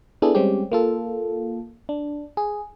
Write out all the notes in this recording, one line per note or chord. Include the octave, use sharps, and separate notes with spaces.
B3 D4 E4 G#4 A4
G3 G#3 C4 C#4 G4
A#3 F4 A4
D4
G#4